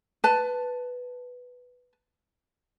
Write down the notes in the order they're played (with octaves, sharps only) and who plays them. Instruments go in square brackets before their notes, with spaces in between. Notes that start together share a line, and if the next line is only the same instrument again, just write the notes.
[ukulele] B4 A5